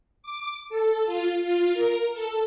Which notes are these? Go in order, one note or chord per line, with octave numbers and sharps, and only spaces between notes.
D6
A4
F4
F4
A#4
A4